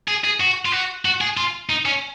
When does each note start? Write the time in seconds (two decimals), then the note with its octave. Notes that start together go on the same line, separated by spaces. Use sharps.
0.08 G#4
0.24 G#4
0.40 F#4
0.65 F4
0.72 F#4
1.05 F#4
1.21 G#4
1.37 F4
1.69 D#4
1.85 C#4